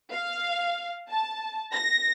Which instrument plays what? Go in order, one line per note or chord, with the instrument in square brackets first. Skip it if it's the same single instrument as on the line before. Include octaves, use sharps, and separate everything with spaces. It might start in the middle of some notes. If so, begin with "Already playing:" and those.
[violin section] F5
A5
A#6